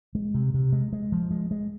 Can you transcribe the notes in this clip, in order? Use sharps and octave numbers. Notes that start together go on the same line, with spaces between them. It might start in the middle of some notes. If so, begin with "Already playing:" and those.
G#3
C3
C3
G#3
G#3
F3
G#3
G#3